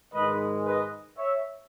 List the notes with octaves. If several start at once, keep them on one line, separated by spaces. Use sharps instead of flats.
G#2 D#3 G#3 B4 D#5
B4 D#5
C#5 E5